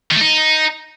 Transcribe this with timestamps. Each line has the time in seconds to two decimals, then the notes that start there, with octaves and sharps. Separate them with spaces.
0.11 D#3
0.16 A3
0.21 D#4